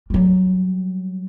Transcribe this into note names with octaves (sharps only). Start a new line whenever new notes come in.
F#3 G3